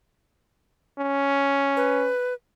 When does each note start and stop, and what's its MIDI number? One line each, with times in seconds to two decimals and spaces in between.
0.99 2.10 61
1.77 2.34 71